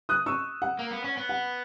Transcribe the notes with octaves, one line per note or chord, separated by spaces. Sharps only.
D#6 F#6
C#6 E6
F#5
A#3
B3
C#4
B3
F#5